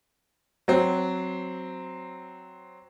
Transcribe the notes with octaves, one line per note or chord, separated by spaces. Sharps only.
F#3 C4